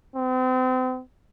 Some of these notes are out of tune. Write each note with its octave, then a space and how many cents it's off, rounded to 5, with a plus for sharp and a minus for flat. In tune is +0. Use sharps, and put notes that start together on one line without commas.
C4 -35